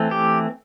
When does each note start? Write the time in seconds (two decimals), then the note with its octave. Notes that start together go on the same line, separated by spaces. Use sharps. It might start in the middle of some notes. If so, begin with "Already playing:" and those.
Already playing: E3 A3 C4
0.11 G4